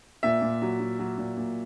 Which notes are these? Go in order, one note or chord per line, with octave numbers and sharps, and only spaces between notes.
A#2 E5
A#2
F#3
F#3
F#3
A#2
A#2